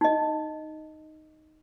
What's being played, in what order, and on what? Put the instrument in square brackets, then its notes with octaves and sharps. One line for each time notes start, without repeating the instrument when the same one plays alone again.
[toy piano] D#4 D#5